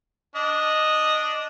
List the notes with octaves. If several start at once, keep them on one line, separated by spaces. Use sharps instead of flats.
D4 D#5